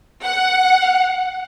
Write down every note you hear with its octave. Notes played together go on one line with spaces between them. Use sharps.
F#5